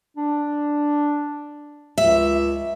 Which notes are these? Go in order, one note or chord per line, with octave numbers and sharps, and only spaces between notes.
D4
C#2 E5